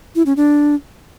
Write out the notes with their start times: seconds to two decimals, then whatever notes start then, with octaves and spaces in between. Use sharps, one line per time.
0.16 E4
0.26 C#4
0.37 D4